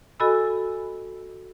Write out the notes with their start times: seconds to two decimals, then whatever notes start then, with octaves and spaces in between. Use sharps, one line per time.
0.20 F#4 A4 D#5 G#5 B5 E6